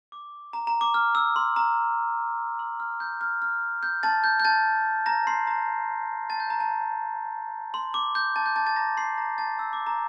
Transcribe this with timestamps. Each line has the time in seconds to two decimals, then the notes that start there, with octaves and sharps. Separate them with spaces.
0.12 D6
0.53 A#5
0.67 A#5
0.81 D6
0.94 F6
1.15 E6
1.36 C6
1.56 A#5
2.59 C6
2.80 F6
3.00 G6
3.21 F6
3.42 F6
3.83 G6
4.03 A5 A6
4.24 G6
4.40 G6
4.45 A5 A6
5.06 A#5 A#6
5.27 C6 C7
5.47 A#5 A#6
6.30 A5 A6
6.40 G6
6.50 A#5
6.60 A5
7.74 C6
7.94 D6
8.15 G6
8.36 A5 A6
8.46 G6
8.56 A5 A6
8.66 A5 A6
8.76 A#5 A#6
8.97 C6 C7
9.18 A#5 A#6
9.38 A5 A6
9.59 E6
9.73 D6
9.86 A#5